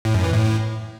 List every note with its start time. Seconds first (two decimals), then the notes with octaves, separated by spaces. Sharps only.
0.05 A2
0.14 F#2
0.24 E3
0.33 A2